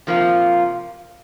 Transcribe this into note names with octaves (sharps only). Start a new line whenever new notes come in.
C3 F3 A#3 F4